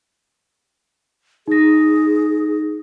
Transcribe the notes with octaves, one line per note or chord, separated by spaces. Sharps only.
D#4 G#4 A#6